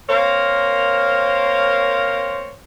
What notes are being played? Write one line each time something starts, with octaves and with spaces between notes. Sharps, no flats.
A#3 C4 A#4 C5 C#5 F5